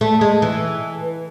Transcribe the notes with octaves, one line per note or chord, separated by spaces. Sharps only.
A3
G#3
E3